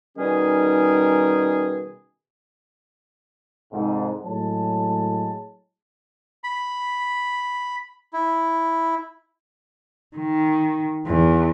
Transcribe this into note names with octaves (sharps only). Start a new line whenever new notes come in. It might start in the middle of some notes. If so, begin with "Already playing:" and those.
B2 D#3 G3 C#4 D#4 G#4
C2 F2 G#2
A2 F#3 G#3 C#5 A5
B5
E4
D#3
E2